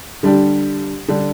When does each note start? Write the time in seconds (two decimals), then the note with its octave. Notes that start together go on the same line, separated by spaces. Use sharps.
0.23 D3 G3 D4 G4
1.08 D3 G3 D4 G4